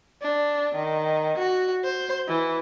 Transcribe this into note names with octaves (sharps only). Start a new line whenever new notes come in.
D4
D#3
F#4
C5
E3